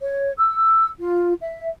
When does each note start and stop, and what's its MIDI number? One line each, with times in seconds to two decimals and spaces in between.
0.01 0.32 73
0.38 0.88 88
0.99 1.34 65
1.42 1.70 76